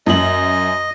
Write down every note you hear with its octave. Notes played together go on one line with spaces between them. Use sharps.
F#2 D#5 F#7